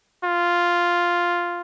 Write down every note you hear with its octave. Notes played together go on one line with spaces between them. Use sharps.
F4